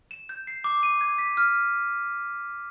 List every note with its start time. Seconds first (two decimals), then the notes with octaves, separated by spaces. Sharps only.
0.11 E7
0.29 G6
0.47 C7
0.64 D6
0.83 D#7
1.01 G#6
1.18 B6
1.37 F6